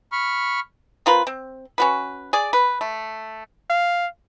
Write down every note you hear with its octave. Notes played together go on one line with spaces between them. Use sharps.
B5 C#6 F6
C4 F4 A#4 B4
C4
C#4 F#4 B4
G#4 D5
B4
A3
F5